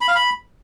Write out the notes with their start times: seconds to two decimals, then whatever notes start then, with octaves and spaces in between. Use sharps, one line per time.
0.01 B5
0.08 F5
0.15 B5